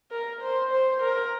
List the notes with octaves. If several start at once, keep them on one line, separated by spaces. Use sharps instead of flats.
A#4
C5
C5
A#4